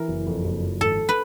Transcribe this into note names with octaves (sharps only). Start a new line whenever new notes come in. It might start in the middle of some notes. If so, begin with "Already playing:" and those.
Already playing: E3 A#4
F#1
F2
F#1
F3
G#1 A4
B4